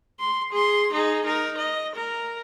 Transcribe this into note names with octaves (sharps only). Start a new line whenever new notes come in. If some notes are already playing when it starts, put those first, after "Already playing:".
C6
G#4 C6
D#4 G#4
D#4 A#4
D#5
A#4